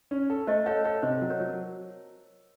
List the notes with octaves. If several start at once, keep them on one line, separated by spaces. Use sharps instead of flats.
C#4
A4
A3 C5 D#5
A4 C#5 F5
A4 C#5 F5
C3 C5 D#5
F#3
A#4 C#5
F#3